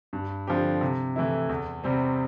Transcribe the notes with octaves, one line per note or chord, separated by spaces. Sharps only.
G2
D3 F3 C4 G4
C3
E3 A3 E4
E2
C3 G3 C4